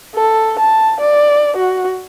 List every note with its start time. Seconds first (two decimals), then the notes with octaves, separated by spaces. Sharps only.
0.15 A4
0.59 A5
1.00 D5
1.57 F#4